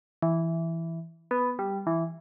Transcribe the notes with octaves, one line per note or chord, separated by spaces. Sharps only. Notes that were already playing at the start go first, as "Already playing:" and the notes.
E3
B3
G3
E3